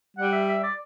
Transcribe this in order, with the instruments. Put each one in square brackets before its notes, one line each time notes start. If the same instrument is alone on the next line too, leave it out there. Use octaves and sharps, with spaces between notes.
[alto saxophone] G3 [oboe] F#5
[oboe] E5
E5
D5